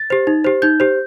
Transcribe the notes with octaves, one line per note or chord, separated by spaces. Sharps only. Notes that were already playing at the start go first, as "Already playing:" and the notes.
Already playing: A6
G4 C5
D#4
G4 C5
D#4 G6
G4 C5